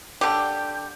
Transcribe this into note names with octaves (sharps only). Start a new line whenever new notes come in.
D3 G4